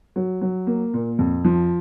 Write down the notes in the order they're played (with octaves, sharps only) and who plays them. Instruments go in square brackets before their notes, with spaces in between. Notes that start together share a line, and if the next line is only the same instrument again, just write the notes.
[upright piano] F#3
F#3
A#3
A#2
F2
F3